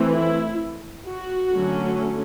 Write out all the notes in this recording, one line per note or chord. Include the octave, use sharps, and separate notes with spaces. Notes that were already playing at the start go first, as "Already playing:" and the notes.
Already playing: E3 A3 C4
E4
F#4
D3 F#3 A3 C#4